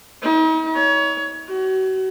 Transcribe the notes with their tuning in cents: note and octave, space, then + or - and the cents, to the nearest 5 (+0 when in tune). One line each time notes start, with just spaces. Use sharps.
D#4 +45
C#5 +25
F#4 +35